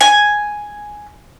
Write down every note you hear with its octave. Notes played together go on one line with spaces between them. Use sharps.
G#5